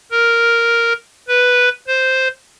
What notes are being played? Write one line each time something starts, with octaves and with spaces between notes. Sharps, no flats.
A#4
B4
C5